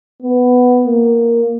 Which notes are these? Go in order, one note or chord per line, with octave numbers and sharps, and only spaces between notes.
B3
A#3